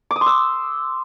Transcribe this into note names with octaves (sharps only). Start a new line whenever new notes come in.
D6
D#6
C6
E6